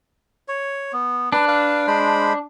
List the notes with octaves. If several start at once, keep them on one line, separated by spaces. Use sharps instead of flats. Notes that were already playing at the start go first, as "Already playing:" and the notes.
C#5
B3
D4 B4
B4 F5
G#3 C5 B5